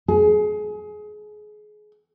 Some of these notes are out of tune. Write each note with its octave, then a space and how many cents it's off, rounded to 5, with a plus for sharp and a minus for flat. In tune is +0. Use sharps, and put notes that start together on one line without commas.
G#4 +25